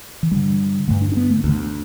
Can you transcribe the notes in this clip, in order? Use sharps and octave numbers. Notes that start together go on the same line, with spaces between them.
E3
G2 D3 G3
G2 D3 A3
D4
D4
B3
A3
D2 D3